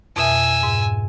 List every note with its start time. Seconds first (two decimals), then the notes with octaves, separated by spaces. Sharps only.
0.16 F2 B2 E5 G#5 E6
0.63 G#2